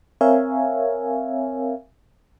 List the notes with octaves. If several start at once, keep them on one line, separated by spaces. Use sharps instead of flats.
C4 A#4 C#5 E5 F5 G#5